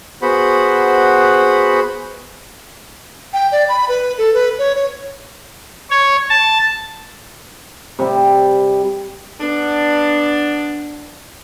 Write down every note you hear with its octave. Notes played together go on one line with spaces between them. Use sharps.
B3 F#4 G#4 C5 F#5 B5
G5
D5
B5
B4
A4
B4
C#5
C#5
C#5
A5
C3 G3
B3 D4